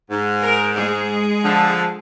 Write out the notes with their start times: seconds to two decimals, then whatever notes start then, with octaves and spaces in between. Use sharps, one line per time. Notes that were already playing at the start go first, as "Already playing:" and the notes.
0.11 G#2
0.42 A#4
0.75 G#3 G#4
1.44 D3 F3